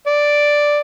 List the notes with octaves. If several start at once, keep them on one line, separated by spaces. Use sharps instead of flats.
D5